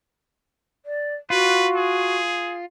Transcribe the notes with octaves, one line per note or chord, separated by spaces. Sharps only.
D5
F4 F#4 B4
G#4